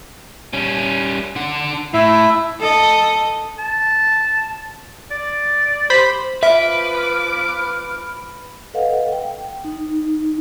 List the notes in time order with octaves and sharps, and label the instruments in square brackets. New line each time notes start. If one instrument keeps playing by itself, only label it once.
[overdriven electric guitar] G3 C#4
D3 F#5
[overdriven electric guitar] A2 [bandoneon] E4 E5
[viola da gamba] A4 D#5
[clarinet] A5
D5
[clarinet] G4 [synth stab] C5 B5 B6
[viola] F3 D6 [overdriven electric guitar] B4 [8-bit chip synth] E5 [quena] F6
[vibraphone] A4 B4 D#5 F5 F#5
G5
D#4